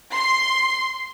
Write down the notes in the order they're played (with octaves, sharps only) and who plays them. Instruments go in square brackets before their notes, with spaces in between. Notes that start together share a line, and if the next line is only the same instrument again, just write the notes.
[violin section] C6 C7